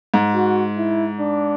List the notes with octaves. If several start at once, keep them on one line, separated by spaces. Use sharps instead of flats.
G#2
F#4
E4
D4